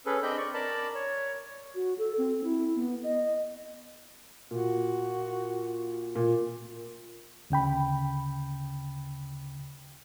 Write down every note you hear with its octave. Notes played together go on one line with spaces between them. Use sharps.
C#4 G#4 A4 B4
C4 D4 D#5 G5 B5 G6
D5 C#6
A#4 D5 A5 B5
C#5
F#4
A4
C4
E4
B3
D#5
A#2 F#4
A#2
D2 C#3 G5 B5